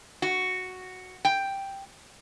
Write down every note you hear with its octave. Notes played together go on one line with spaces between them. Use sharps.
F#4
G5